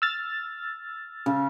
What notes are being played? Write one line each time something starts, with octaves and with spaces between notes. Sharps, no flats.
E6 F6 A6
C#3